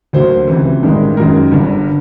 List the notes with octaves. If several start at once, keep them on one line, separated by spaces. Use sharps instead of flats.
D2 D3 F#3 A#3 C5
C#2 C3 E3
A1 G2 D#3 G#3
F#2 D#3 G#3 A#4
G1 G2 D3